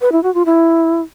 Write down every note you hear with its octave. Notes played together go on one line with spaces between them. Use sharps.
B4
E4
F#4
F4
E4